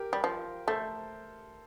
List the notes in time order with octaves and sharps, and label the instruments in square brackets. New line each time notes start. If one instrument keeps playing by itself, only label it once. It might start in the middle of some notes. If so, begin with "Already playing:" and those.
Already playing: [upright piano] G4 A#4
[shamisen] G3
F3
[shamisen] A3 [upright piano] A4 C5